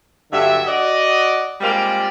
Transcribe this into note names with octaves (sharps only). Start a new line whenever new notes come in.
G2 D3 F#3 E5
F#4 D5 D#5
G3 G#3 A#3 C4 F4 D5